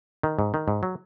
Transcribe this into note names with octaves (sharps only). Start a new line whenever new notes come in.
D#3
G#2
D#3
G#2
F#3